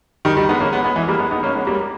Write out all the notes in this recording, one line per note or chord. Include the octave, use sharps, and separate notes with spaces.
D#3 G3
D#3 G3
G#3 B3
A#3 C#4
G#3 B3
G#3 B3
E3 G#3
G3 A#3
G#3 B3
B3 D#4
A#3 C#4
G#3 B3
G3 A#3